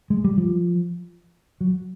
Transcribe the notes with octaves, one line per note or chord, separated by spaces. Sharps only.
G#3
G3
F3
F#3